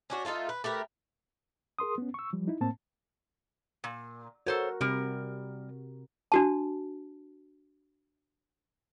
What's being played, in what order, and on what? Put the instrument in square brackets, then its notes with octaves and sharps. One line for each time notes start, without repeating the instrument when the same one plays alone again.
[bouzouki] C#4 D4 F#4
A3 D#4 F4 A4
B4
A3 G4 A#4 B4
[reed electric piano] G#4 A#4 C6 D#6
B3 C#4
C#6 E6
F3 G3
D#4 E4
A2 A#3 C4 A5
[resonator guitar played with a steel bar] A#2
[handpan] F#4 A#4 [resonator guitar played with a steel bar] A4 C5 C#5
[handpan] C3 [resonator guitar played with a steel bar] G3 A#4
[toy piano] D4 F#4 A5